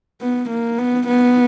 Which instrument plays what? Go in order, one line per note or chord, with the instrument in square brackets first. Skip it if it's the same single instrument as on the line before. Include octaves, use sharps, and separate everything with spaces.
[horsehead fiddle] B3
A#3
B3
B3